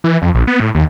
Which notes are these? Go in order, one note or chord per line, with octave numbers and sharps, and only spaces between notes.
E3
F2
A#1
B3
A2
D#2